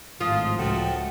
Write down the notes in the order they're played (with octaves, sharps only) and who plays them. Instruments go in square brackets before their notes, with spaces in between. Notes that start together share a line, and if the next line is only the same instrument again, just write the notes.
[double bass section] G#1 A2 [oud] F3 [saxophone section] F4 [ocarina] D#6
[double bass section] C#2 [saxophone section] A3 F#4 [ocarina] G5